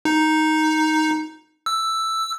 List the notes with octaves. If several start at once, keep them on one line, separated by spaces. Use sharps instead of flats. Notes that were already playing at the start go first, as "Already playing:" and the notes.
D#4
E6